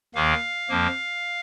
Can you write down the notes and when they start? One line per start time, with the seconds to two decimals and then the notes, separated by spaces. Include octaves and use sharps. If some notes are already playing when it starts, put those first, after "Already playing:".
0.15 D#2 D#3 A#3 F5
0.69 F2 F3 A#3